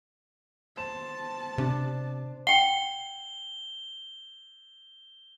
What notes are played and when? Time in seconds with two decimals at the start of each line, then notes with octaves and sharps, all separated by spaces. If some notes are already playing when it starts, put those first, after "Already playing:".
0.77 B3 C5 A5 E7
1.58 C3 D4 D6
2.47 F#5 G5 G7